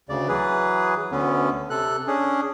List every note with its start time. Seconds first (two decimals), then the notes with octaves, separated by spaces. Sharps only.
0.09 D2 C#3 D5
0.28 E3 F#3 G#4 B4
1.12 D2 D3 B3 C#4
1.70 C3 A4 F#6
2.07 C#4 D4 G#4